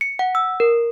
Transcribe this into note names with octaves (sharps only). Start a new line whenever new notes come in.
C#7
F#5
E6
A#4